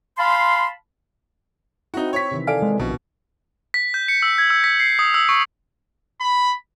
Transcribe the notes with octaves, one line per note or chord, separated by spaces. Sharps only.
F5 A5 B5 C6
C4 D#4 E4 F#4
C#5 C#6 B6
C3 D#3 E3
A4 D5 F5 G#5 D7
G#3
A#1 B2 D4
B6
G6
C#7
E6
G#6
E6
B6
C7
D#6
E6
C#6
B5